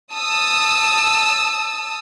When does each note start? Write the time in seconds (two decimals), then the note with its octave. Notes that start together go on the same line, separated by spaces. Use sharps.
0.12 A5 D#6 E6